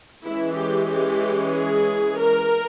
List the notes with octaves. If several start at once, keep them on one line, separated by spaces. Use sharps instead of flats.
E3 G#3 C#4 E4
G4
G4
G#4
A#4